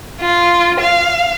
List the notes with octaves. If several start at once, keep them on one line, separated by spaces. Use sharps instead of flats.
F4
F5